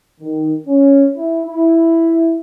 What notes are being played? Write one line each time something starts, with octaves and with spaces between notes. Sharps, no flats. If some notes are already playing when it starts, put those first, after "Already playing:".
D#3
C#4
E4
E4